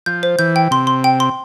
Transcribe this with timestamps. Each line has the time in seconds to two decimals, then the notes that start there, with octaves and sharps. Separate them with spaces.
0.06 F3 G6
0.23 C5
0.39 E3 G6
0.56 G5
0.71 C3 C6
0.87 C6
1.04 G5
1.20 C6